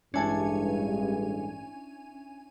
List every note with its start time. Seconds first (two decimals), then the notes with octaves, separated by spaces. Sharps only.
0.14 A1 G2 G#3 C#4 D4 E4 G#5 A5